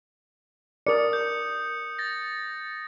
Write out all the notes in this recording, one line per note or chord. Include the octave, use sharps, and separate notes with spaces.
A#4 D5 D#6 C#7
G6
A6 A#6